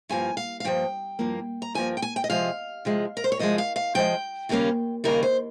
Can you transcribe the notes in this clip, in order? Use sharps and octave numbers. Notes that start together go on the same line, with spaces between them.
G2 F3 A#3 G#5
F5
F5
G2 F3 A#3 G5
G2 F3 A#3
A#5
G2 F3 A#3 G#5
G5
G#5
G5
D#5
C3 F3 G#3 F5
C3 F3 G#3
A#4
C5
C#5
C3 F3 G#3 D#5
F5
F5
C3 F3 G#3 G5
D#2 C#3 G3 A#3 C#4
D#2 C#3 G3 A#3 C#4 A#4
C5